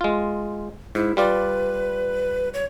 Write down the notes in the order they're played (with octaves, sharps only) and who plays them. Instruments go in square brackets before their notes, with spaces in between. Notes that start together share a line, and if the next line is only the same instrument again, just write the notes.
[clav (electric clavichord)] G#3 F4
[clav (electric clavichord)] G#2 [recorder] E4
[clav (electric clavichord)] G3 F4 D5 [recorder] B4
[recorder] C#5